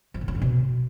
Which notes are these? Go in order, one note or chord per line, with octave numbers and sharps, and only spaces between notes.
F3
A2
C#4
D3
B2